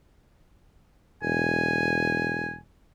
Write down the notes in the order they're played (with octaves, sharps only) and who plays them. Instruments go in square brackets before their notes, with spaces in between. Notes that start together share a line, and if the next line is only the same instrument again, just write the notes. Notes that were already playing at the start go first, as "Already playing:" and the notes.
[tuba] E1 [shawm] G#5